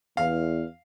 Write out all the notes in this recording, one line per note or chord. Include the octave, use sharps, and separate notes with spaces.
E2 F5